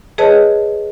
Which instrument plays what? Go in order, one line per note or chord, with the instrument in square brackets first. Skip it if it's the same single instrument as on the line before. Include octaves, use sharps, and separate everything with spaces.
[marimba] G#4 B4 C#5 D#5 A5